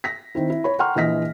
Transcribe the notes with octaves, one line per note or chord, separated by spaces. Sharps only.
A#6 B6
D#3 C4 E4
E4
C#5 B5
F#5 G5 A#5 C6 C#6 F6
A#1 E3 D#5 A#6 B6